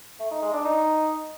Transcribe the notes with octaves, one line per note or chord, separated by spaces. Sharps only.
A3
D#4
G#3
D4
D#4